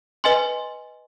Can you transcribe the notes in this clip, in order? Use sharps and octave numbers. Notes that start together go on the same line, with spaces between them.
B4 D#5 G#5 C6